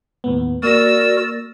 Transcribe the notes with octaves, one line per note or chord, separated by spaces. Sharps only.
D#2 A2 B3
A#3 F#4 A#4 D5 E6 A#6